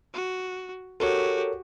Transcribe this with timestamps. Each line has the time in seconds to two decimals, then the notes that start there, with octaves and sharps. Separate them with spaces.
0.14 F#4
1.00 F#4 G4 A4 A#4 C#5